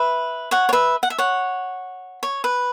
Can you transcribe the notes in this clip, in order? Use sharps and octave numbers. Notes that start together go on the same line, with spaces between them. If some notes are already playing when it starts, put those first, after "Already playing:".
Already playing: B4 E5
C#5 F#5
C#5
B4 E5
F#5
E5
C#5 F#5
C#5
B4